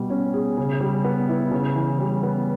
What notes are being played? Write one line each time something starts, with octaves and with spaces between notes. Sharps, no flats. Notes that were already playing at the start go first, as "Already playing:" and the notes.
Already playing: B2 G3
C#4
G#4
C#3
G3
B3
E4
C#3
E3
G3
B3